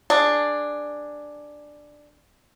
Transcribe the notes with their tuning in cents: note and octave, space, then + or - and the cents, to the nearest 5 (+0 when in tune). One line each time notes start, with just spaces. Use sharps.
D4 +5 G#4 +0